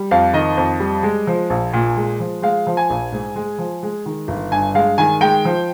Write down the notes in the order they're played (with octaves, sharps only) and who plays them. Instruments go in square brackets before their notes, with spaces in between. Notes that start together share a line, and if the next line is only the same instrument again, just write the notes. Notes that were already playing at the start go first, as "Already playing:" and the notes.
Already playing: [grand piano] G3
F2 F5
D#3 D#5
F2
G3
G#3
F3
A#1
A#2
G#3
F3
G#3 F5
F3
G#5
A#1
G#2
G#3
F3
G#3
D#3
G1
G2 G#5
G#3 F5
D#3 G#5
G#3 G5
F3